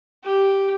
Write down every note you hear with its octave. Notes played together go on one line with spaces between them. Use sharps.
G4